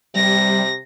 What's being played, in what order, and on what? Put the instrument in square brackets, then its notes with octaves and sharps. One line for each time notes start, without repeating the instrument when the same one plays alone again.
[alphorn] C3 [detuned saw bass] G3 [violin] A#6